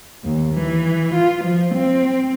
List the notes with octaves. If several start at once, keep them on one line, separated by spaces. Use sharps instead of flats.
D#2
E3
F4
F3
C4